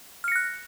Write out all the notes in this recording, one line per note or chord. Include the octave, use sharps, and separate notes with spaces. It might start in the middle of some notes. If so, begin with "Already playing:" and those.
F6 F#6 A#6 C#7